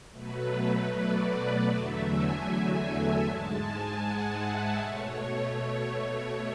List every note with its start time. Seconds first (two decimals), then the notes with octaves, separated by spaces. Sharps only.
0.12 B2 F#3 A3 B4
0.90 D5
1.67 E2 D3 F#3 A3 E5
2.06 G#5
2.45 G#5
3.22 G#2 G#3 A5
3.61 G#5
4.00 F#5
4.40 E5
4.78 B2 A3 C#5